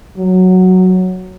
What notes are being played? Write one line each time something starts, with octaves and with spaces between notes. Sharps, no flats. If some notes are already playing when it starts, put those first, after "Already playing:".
F#3